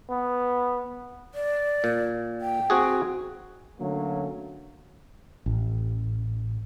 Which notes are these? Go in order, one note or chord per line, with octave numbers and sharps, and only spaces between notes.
B3
D5
A#2
G5
C4 F#4 G#4
D3 F#3 A3 A#3 C#4
A1